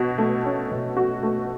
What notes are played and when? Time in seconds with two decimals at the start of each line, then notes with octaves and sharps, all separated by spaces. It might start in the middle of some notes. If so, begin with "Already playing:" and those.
Already playing: B2 F#4
0.18 A3
0.45 C#4
0.71 B2
0.97 F#4
1.23 A3